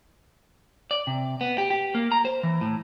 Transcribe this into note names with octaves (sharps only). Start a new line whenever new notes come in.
D5
C3
B3
G4
G4
A#3
A#5
C5
E3
A2